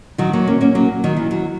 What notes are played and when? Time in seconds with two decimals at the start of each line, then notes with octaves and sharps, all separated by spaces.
0.18 D#3 F#3
0.33 F#3 A#3
0.47 A#3 C#4
0.61 A#3 C#4
0.75 F#3 A#3
1.04 D#3 F#3
1.17 E3
1.31 F#3